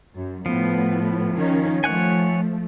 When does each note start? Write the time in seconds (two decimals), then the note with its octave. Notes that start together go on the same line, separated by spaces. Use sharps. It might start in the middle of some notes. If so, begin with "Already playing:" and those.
0.15 F#2
0.46 A2 F3 B3
1.37 D#3 C#4
1.84 F3 A3 C#5 F#5 G#5